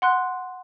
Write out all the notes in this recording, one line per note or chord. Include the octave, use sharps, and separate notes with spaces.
F#5 C6 F#6